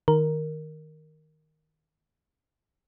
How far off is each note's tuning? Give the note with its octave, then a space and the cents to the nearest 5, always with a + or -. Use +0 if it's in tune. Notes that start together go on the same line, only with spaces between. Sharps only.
D#3 +0 A#4 +0